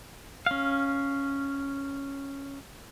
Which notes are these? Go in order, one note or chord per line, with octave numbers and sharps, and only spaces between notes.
C#4 F5